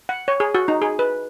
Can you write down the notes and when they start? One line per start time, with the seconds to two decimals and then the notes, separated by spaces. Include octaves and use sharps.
0.09 F#5
0.28 C#5
0.40 G#4
0.55 F#4
0.68 D#4
0.82 G#4
0.99 B4